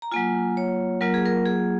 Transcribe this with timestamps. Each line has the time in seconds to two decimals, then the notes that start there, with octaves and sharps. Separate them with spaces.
0.02 A#5
0.12 F#3 A#3 F4 G#5
0.57 C#5
1.01 F#3 A#3 F4 A#4
1.14 G#4
1.25 A#4
1.46 G#4